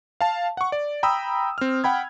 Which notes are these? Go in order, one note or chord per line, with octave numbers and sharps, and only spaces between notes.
F5 A5
F#5 C#6
D5
G5 A#5 B5 D#6 E6
C4 F6
F#5 G5 B5 G#6